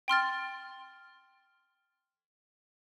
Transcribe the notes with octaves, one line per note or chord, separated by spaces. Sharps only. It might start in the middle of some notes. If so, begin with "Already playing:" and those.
G5 C6 F6 A6